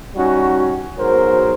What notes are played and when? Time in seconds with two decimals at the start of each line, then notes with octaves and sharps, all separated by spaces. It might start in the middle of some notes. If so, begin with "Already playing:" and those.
0.15 G3 C#4 D#4 F#4
0.97 G#2 B2 F#3 A#4 C5